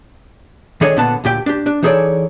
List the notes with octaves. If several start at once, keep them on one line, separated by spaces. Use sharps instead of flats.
D#3 D4 G#4 A4 C#5 D#5
A#2 D3 B3 F#5 A5
D2 A#2 G4 G5
D4 G4
D4
E3 D#4 G#4 A4 C#5 D5